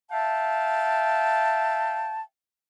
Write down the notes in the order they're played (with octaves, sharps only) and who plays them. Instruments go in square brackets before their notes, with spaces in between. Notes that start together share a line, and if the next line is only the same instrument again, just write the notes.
[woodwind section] E5 F5 G5 A5